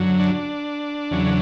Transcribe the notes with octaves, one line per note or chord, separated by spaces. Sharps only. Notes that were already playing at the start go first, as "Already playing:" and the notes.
Already playing: F#2 D3 F#3
D4
E2 C#3 F#3